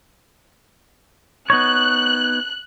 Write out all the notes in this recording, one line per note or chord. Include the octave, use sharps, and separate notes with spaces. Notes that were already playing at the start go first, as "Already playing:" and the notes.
B3 D#4 C#5 F#6